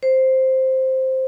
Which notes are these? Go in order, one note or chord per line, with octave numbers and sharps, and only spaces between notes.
C5